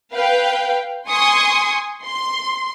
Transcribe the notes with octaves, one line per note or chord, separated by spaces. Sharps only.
B4 F5 G5
G#5 C6 C#6 D#6
C6